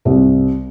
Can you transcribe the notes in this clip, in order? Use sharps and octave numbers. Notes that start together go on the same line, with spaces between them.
C2